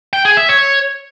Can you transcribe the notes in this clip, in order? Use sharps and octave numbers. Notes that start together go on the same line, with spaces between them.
G5
G#4
E5
C#5